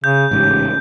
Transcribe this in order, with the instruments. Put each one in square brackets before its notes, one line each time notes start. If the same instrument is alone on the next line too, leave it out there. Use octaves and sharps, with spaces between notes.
[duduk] C#3 [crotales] G6
[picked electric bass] A1 G#2 C#3 [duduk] G4